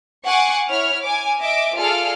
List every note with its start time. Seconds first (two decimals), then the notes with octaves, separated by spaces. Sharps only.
0.25 F#5 G#5 C#6 D6 C7
0.68 E4 C#5 F6
1.02 G#5 D6
1.41 D#5 E5 D6
1.76 F4 G#4 A4 D5 F6